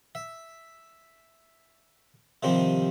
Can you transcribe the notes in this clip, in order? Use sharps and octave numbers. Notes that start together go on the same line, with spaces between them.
E5
C3 D#3 F3 G3 C4